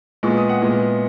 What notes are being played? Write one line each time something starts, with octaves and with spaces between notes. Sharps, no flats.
A#2 G#3 B3 C#6
D#6
F#5
A#2 G#3 B3